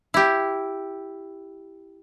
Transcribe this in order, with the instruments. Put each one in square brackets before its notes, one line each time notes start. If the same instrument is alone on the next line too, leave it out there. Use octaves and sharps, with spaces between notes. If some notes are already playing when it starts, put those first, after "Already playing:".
[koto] E4 G4